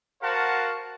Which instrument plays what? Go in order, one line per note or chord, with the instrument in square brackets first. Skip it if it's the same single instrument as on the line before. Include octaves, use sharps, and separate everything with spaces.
[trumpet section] F#4 A#4 C5 F5 F#5 A5